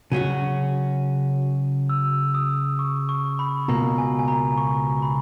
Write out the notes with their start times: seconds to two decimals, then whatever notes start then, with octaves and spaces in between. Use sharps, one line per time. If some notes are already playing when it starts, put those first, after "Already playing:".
0.12 C#3 F#3 C#4 F#4 D#7
1.89 E6
2.35 D#6
2.79 C#6
3.09 C#6
3.39 B5
3.68 C#2 B2 A#3 A#5
3.98 G#5
4.19 G#5
4.28 A#5
4.57 C#6
5.02 B5